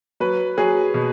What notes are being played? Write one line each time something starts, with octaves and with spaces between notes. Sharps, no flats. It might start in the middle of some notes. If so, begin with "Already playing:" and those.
F#3 B4
F#3 G#4
B2